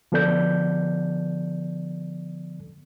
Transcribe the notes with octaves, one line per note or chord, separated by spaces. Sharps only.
D3 F3 B3 A4 D5 G6